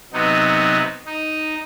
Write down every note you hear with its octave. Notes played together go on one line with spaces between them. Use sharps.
C3 F#3 B3 D#4
D#4